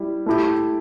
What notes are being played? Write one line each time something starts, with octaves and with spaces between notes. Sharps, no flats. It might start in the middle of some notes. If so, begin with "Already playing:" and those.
Already playing: G3 E4 G4
A3 E4 G4